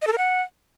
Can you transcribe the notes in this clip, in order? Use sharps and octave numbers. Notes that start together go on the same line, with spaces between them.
D#5
A4
A#4
F#5